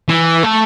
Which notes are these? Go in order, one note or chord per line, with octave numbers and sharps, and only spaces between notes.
E3
A3